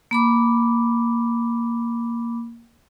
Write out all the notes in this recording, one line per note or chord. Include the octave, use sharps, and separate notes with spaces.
A#3 B5 D6